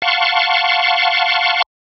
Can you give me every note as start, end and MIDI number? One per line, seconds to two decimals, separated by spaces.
0.02 1.62 77
0.02 1.62 78
0.02 1.62 81
0.02 1.62 84
0.02 1.62 85